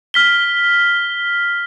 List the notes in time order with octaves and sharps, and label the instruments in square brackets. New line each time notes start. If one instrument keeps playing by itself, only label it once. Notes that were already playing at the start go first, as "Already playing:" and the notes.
[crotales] F6 B6 G7